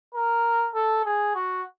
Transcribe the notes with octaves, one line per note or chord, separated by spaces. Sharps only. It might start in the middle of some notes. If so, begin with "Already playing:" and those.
A#4
A4
G#4
F#4